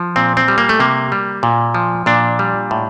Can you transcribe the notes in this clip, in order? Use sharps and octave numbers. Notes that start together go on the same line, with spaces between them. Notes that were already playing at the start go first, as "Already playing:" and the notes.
Already playing: F3
A#2 C4
C4
G3
A#3
A3
C3 A#3
G3
A#2
F3
A#2 D4
G3
A2